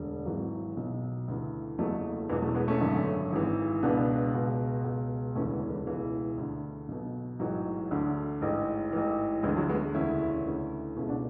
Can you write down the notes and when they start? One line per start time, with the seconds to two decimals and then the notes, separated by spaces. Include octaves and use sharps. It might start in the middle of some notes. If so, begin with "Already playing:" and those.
Already playing: E1 D2 D3
0.25 G#1 G#2 E3 F#3
0.77 B1 B2
1.28 D2 C#3 E3
1.78 F#1 E2 C#3 F#3 A3
2.29 E1 E2 B2 E3 G#3
2.42 F#3 A3
2.55 G#3 B3
2.68 A3 C#4
2.80 G#1 F#2 D3
3.32 G#1 G#2 E3
3.83 C#2 B2 B3 D4
4.34 C#2 B2
4.84 C#2 B2
5.35 E1 D2 C#3 E3 A3 C#4
5.53 G#3 B3
5.69 E3 G#3
5.87 C#2 B2 E3
6.38 D2 D3
6.88 B1 B2
7.39 A1 G#2 E3 F#3
7.91 D2 D3
8.41 A1 G#2 E3
8.93 A1 G#2 E3
9.43 D2 D3 E3 G#3
9.56 F#3 A3
9.69 G#3 B3
9.95 E1 D2 C#3 E3 C#4 E4
10.45 D2 C#3 E3
10.96 B2 C#4 E4
10.99 C#2
11.09 D4 F#4